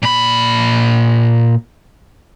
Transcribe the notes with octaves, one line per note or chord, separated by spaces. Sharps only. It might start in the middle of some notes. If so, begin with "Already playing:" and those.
A#2 B5